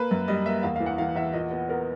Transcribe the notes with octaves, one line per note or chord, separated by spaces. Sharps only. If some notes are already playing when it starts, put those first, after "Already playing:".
Already playing: A#3 B4
F#2
G3 D#5
A#3 E5
E2 F5
F5
E3
F#5
E3 F5
E2 E5
A#2 D#5
B3
B3 A#4